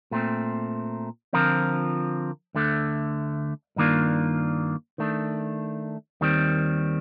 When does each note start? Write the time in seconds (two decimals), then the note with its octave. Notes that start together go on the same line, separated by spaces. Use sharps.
0.11 A#2 A3 C4
1.33 D3 F3 C4 F4 A#4
2.54 D2 D3 A3
3.76 G2 D#3 A#3 D4 F4
4.98 D#3 A3 D4
6.21 D#2 D#3 G3 C4